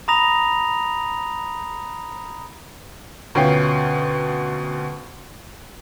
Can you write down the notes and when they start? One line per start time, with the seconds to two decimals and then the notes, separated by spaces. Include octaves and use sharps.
0.08 A#5 B5 D#6 A#6 F7
3.35 D2 B2 C#4 F4 G5 C7